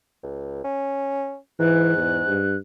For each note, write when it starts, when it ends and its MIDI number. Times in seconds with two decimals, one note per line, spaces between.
0.23 0.62 37
0.64 1.37 61
1.60 2.41 44
1.60 1.93 52
1.60 2.57 90
1.97 2.22 40
2.27 2.56 43